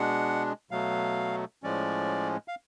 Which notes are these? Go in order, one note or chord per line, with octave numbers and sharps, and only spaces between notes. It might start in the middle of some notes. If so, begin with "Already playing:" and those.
Already playing: B2 G#3 D4 F#5
B2 F#3 A3 F5
A2 F3 G#3 C#4 D5
F5